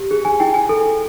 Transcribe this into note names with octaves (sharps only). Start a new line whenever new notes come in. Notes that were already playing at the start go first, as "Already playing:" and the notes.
Already playing: G4
G#4
G#5
E4 G5
G#5
A4